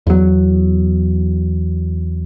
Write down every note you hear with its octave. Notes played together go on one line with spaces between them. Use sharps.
E2 F#3